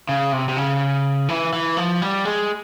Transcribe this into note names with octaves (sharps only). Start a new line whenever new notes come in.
C#3
C3
C3
C#3
E3
E3
F3
G3
G#3